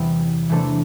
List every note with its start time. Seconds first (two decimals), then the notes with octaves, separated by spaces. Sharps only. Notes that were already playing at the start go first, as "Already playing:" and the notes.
Already playing: E2 C3 E3 G3 B3 E4
0.49 C3 E3 A3 D4 A4